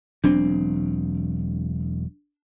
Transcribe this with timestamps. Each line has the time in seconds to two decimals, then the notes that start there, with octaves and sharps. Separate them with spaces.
0.24 E1 F#3 C4 D4